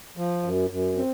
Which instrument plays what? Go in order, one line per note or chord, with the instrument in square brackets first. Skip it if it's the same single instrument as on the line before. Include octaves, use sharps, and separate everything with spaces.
[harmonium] F3
F#2
F#2
C4